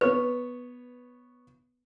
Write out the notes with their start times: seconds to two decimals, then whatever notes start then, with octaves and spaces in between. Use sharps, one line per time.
0.01 B3 B4 C#5